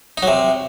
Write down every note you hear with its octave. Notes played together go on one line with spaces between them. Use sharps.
D#4
F#3
C3